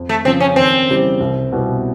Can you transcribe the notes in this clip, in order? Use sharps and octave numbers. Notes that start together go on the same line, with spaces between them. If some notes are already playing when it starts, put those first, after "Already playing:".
Already playing: F2
A3
C#3 F3 C4
C#4
D#2 C4
C#3 E3 G3
C2
B2 G3 B3 E4